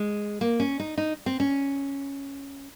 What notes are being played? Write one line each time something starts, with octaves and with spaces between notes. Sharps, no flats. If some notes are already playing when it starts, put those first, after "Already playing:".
Already playing: G#3
A#3
C#4
D#4
D#4
C4
C#4